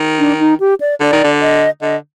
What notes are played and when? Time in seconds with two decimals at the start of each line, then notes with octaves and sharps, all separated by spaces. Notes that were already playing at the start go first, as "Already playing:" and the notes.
Already playing: D#3
0.19 D4
0.40 D#4
0.60 G4
0.81 D5
1.00 D3 D5
1.12 D#3
1.24 D3
1.41 D#5
1.82 D3 D#5